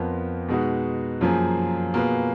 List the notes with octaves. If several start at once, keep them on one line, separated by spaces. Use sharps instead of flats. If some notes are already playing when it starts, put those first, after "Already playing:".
Already playing: F2 F3 B3 F4 A#4
B2 G#3 D#4 F#4 B4
F#2 F3 A#3 F4 G#4
B2 A#3 F4 G#4 B4